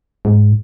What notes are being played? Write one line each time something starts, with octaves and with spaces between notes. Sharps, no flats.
G#2